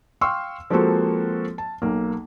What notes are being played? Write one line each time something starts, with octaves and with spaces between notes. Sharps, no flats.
F5 G5 C6 C#6 E6 F6
F3 G#3 A#3 C4 F#4 A4
A5
B1 A#3